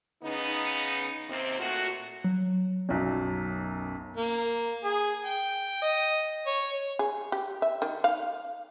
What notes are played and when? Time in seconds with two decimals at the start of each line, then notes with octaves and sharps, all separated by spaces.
0.24 C#3 B3 D#4
1.29 D#2 C3 C4
1.59 A#2 A3 F#4
2.24 F#3
2.89 B1 F#2
4.17 A#3
4.84 G#4
5.25 G5
5.82 D#5
6.46 C#5
6.99 G#4
7.32 G4
7.62 E5
7.82 D#3
8.04 F5